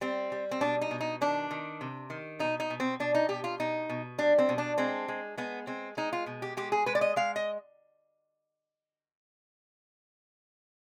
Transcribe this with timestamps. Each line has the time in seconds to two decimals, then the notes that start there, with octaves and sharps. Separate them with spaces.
0.01 G3 C4
0.32 G3
0.51 C4
0.61 B2 D4
0.81 D#4
0.91 B2
1.01 D#4
1.21 D#3 D4
1.51 D#3
1.81 C3
2.10 D#3
2.39 B2 D#4
2.60 D#4
2.70 B2
2.80 C4
3.00 B2 D4
3.15 D#4
3.29 B2 G4
3.44 F4
3.60 B2 D#4
3.89 B2
4.18 G3 D4
4.38 C4
4.49 B2
4.58 D4
4.78 G#3 C4
5.08 G#3
5.37 G#3 B3
5.67 G#3 C4
5.97 G#3 D#4
6.13 F4
6.26 B2
6.42 G4
6.57 G#3 G4
6.72 G#4
6.86 G#3 B4
6.95 D5
7.01 D#5
7.16 G#3 F5
7.36 D#5